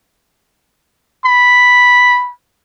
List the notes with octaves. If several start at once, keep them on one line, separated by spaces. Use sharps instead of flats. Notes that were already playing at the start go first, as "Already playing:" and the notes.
B5